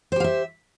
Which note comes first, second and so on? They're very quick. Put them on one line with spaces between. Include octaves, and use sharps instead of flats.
C5 G4 F5 E5